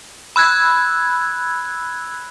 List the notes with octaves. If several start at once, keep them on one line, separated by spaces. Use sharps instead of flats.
B5 E6 F#6 G#6